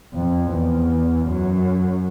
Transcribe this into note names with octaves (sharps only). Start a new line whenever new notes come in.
F2
E2
F#2